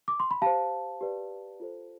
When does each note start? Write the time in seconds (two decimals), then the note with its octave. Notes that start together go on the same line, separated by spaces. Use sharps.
0.08 D6
0.20 C6
0.31 B5
0.42 G4 C5 F5 A5
1.01 G4 B4 D5
1.60 F4 A4 C5